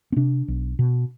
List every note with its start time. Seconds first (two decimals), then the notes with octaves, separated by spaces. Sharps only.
0.12 C4
0.16 C3 D4
0.48 B1
0.79 B2